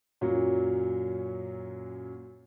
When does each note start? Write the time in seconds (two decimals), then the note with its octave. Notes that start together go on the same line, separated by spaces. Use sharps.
0.21 F#2 A#2 F#3